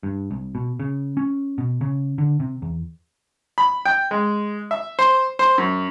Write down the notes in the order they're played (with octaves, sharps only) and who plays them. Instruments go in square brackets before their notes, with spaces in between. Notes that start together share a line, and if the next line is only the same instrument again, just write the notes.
[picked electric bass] G2
C2
B2
C#3
C#4
B2
C#3
D3
C3
E2
[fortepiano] B5
G5
G#3
E5
C5
C5
F#2